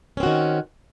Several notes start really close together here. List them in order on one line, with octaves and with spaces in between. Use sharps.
C#4 C4 F#4 D#3